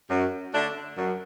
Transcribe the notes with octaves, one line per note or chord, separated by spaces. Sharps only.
F#2
D3 A3 D4
F#2